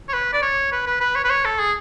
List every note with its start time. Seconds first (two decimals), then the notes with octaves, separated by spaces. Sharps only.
0.09 C#5
0.13 B4
0.33 D5
0.42 C#5
0.72 B4
0.87 B4
1.01 B4
1.16 C#5
1.24 B4
1.30 C#5
1.45 A4
1.59 G#4